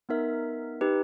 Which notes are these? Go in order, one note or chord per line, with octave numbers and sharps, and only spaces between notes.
B3 D#4 A#4 E5
D#4 G4 B4